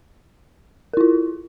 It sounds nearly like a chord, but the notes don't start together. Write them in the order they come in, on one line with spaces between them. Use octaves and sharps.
A#4 E4 F4